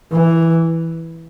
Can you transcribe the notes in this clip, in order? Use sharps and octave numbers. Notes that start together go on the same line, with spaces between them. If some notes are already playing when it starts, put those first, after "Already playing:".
E3